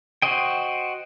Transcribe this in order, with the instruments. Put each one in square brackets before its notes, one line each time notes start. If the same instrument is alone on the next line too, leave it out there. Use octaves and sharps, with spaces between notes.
[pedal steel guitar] F#4 C5 D#5 G5